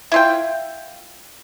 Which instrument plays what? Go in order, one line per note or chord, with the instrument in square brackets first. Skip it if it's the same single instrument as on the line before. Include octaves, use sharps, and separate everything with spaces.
[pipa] E4 F4 G5